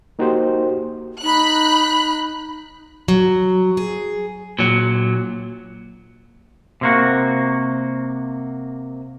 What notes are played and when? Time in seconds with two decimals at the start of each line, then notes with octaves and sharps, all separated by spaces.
0.19 A#3 D#4 F#4 G4 C5
1.23 D#4 B5 F#6
3.08 F#3
3.77 G#4
4.59 A#2 F#3
6.81 C3 A#3 F#4